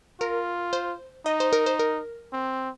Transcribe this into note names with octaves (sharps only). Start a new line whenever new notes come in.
F4 A#4
C5
D#4 D#5
C5
A#4
C5
A#4
C4